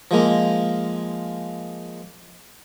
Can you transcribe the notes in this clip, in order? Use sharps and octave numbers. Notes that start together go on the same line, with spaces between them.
F3 G#3 A#3